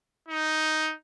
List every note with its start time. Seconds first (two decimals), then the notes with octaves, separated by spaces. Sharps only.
0.28 D#4